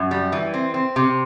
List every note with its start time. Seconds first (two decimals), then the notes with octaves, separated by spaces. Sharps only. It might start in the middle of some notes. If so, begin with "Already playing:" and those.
Already playing: F#2
0.11 G3
0.32 E3
0.54 C4
0.74 C4
0.96 C3